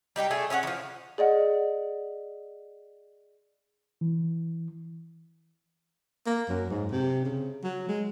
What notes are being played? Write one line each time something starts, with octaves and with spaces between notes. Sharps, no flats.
G3 D#4 G4 G5
A3 G#4 D5
C#4 C#5 D#5 F#5
E3 F3
G#4 D5 D#5 F#5
E3
A#3
F#2
G#2
C3
C#3
F#3
G#3